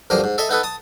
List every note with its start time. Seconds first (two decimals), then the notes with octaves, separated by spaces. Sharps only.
0.10 D2 G2 F3 A#3 A#4
0.24 G#2
0.38 A4 D#5 E5 G#5
0.49 B3 D#4 A4 B4
0.63 A5 D#6